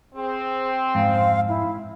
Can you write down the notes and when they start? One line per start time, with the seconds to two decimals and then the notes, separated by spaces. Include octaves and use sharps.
0.15 C4 G#4
0.95 F2 G#2 F5
1.49 E4